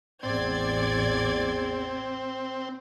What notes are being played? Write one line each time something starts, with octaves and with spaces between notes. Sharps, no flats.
A1 E2 C4 D5 G#6